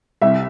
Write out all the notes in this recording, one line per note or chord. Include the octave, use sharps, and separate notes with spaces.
C2 E5